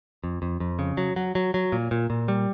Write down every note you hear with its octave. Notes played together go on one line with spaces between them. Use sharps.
F2
F2
F2
C#3
F#3
F#3
F#3
F#3
A#2
A#2
A#2
G3